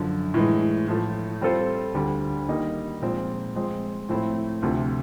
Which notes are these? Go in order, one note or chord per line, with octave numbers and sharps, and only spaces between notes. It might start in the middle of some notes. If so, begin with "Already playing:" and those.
Already playing: F#2 D3 F3
A2 E3 G#3
A2 F3 A3
G3 C4 F4 A4 C5
D2 D3 G3
D#3 G3 A#3 D#4
A#2 F3 G#3 C4
F3 G#3 C4
A2 F3 A3 C4 E4
D2 C3 F3 A3